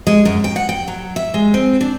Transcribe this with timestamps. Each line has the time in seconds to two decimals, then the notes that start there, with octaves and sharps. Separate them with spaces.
0.07 G#3
0.25 F#2
0.44 G5
0.56 F#5
0.69 G5
0.88 F#3
1.16 E5
1.34 G#3
1.54 C4
1.81 D4